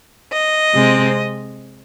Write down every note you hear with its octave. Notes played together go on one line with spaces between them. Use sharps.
D#5
C3 G#3 C4